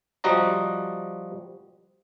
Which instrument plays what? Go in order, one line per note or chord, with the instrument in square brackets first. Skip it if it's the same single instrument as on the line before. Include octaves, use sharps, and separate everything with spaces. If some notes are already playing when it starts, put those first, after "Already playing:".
[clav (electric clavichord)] F3 G3 F#4 D#5 A#5